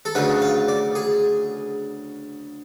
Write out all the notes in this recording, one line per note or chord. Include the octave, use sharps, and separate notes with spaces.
A4
D2 C#3 F#3 B4
F5
D5
G#4